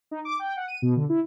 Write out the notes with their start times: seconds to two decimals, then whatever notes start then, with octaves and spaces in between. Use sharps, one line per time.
0.11 D#4
0.25 D6
0.39 G5
0.57 F#5
0.68 D#7
0.82 B2
0.96 D3
1.09 E4